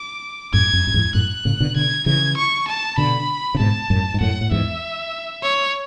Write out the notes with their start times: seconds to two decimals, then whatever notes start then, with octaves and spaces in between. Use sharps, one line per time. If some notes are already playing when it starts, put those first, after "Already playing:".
Already playing: D6
0.53 F#2 A2 G#6
0.73 F#2
0.87 F#2
0.94 E2 G#2
1.15 F#2 A2 F#6
1.45 A2 C#3
1.60 B2 D3
1.75 B2 D3 G#6
2.06 C#3 E3 G#6
2.37 C#6
2.67 A5
2.98 B2 D3 B5
3.55 C#3
3.59 G#2 B2 A5
3.90 F#2 A2
4.14 G#2
4.21 F#2 A2 F#5
4.41 A2
4.51 E2 G#2 E5
5.42 C#5